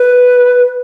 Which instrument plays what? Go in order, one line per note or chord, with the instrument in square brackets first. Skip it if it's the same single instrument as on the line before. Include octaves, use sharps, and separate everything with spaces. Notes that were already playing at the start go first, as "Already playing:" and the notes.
Already playing: [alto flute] B4